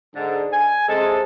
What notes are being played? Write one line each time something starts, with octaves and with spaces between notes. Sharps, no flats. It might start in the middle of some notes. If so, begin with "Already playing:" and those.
G#2 D3
G#5
C3 G#3 A4